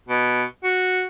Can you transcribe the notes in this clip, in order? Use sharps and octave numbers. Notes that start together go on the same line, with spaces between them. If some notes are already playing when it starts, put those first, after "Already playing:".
B2
F#4